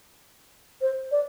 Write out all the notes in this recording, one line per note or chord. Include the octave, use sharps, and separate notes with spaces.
C5
D5